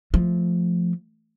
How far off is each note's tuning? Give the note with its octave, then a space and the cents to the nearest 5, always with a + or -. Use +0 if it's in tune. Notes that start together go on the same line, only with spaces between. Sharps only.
F3 +0 A3 +0